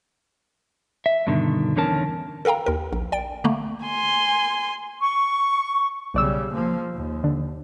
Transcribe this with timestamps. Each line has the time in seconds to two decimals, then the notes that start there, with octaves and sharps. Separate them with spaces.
1.06 E5
1.27 G2 B2 D3 D#3
1.76 E2 D3 D#3 C#4 A#4 A5
2.45 A4 A#4 F5 G5 A#5
2.66 D#2 A#4
2.93 A#1
3.12 D5 G5 D7
3.44 D3 A3 A#3
3.85 G#5 C6
5.01 C#6
6.14 B1 C#3 G3 D5 E6
6.52 F3 A#3
6.94 D#2
7.24 D3